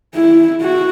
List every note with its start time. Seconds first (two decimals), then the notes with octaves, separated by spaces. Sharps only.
0.15 E4
0.61 F#4